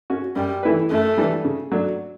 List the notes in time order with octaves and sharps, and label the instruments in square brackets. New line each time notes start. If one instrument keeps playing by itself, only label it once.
[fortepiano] C#4 F#4
[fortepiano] F#2 [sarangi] G3
[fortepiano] E3 A3 E4 B4
[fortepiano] F#2 [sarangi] A3
[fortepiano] E3 G3 D4 A4
C#3
F#3 A3 D4